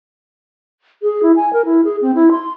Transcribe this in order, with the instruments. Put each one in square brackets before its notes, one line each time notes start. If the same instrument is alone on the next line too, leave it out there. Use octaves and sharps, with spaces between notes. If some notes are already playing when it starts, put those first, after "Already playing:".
[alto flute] G#4
E4
G#5
A#4
E4
G#4
C4
E4
C6